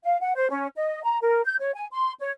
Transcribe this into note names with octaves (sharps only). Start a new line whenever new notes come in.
F5
F#5
C5
C#4
D#5
A#5
A#4
G6
C#5
G#5
C6
C#5